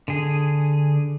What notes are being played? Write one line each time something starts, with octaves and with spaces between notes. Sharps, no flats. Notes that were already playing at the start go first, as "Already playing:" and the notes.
D3 G#4